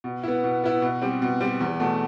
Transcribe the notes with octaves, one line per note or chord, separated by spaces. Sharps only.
B2
B3 E4
B2
B3 E4
B2
G3 C4
B2
G3 C4
E2
B2 A3